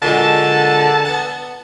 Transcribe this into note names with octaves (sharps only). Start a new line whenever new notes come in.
A#2 D3 F#3 G#3 A5
B3 F#5